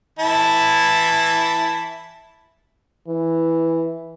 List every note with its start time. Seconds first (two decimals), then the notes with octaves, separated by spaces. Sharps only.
0.19 E3 E4 A5
3.08 E3